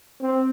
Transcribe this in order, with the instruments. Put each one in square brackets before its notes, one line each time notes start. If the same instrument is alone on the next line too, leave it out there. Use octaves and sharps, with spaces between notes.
[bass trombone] C4